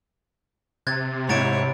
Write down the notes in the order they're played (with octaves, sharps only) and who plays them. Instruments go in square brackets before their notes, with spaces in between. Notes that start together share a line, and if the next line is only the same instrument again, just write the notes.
[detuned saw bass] C3 [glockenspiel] F#6 G#6 A6
[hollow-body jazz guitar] G#2 E4 [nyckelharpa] C#5 [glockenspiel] A#5 A6 D7